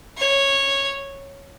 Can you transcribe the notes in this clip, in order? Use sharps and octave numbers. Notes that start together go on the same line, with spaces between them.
C#5